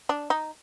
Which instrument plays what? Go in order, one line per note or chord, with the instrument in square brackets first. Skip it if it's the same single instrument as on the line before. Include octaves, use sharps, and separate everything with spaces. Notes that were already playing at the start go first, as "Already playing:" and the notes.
[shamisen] D4
D#4